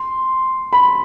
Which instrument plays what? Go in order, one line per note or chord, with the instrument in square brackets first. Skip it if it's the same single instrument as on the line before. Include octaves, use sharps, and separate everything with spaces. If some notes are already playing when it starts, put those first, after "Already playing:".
Already playing: [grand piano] C6
B5